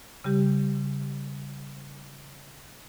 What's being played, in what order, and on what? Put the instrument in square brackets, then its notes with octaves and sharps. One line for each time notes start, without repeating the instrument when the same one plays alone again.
[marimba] C#3 G3 G4